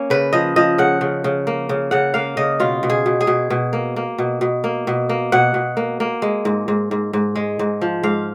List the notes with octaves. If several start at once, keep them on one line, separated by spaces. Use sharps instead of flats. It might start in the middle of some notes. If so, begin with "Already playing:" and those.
Already playing: A#3 C#4
C#3 B4
F3 D#5
F3 D#5
C#3 F#5
C#3
C#3
A#3
C#3
C#3 F#5
A#3 F5
C#3 D#5
B2 F4
B2
G#4
B2
G#4
B2
B2
A#3
A#3
B2
B2
A#3
B2
A#3
B2 F#5
B2
A#3
A#3
G#3
G#2
G#2
G#2
G#2
G#3
G#2
F3
G#2 F5